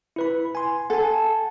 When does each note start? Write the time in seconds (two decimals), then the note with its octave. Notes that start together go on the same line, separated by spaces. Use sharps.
0.16 E4 B4 B5
0.55 G#5 C6
0.90 A4 F#5 G#5